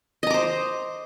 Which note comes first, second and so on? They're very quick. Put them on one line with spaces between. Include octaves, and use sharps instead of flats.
D#5 A#5 D6 C5